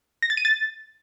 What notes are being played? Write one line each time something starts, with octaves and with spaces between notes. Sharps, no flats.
A#6
A6
D#7
A6